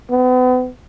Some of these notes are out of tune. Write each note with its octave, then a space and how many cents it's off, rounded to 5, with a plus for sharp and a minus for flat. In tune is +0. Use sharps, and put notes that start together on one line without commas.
B3 +40